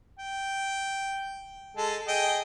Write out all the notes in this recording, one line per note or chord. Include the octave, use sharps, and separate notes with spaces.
G5
G#3 A4
G#4 D#5 G5